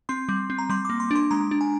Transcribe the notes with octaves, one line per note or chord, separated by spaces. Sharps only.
C4 C6
G3
C4
A#5
G3 C6
A#3 D6
C6
D4 C6
G#3 A#5
D4
G#5